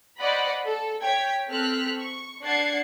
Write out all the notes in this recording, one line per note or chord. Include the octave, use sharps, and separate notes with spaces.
C5 D5 D#5 F#5 B5
A4
C#5 G5 G#6 B6
C4 A4 F6 F#6 B6
C#6
D4 F#5 G#6 A6 C7 C#7